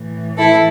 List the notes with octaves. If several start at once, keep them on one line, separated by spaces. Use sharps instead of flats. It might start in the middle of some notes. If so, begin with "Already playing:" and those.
Already playing: A2 E3
E4 A4